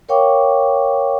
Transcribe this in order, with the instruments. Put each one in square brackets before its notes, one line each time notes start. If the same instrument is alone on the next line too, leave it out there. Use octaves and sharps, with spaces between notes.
[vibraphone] A#4 C#5 F5 G5 C#6 D6